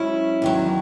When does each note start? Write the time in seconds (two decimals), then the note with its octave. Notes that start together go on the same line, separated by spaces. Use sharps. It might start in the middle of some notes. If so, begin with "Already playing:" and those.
Already playing: G#2 F#3 C#4 E4
0.42 E2 D#3 F#3